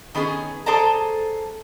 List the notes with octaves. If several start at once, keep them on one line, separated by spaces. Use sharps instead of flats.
D#3 B3 C#4 G#4
G#4 A4 C5 D5 A5 A#5